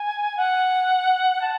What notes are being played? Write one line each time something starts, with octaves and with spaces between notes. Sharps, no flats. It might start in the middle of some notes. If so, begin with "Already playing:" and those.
Already playing: G#5
F#5
A5